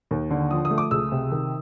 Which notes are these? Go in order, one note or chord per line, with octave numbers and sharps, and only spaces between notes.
D#2
D3
F3 D#6
D#6
A3
D6
C#2 E6
C3
D#3